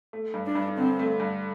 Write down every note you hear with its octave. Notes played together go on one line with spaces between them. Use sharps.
A3
G2
D4
G2
D3 C4
A3
G2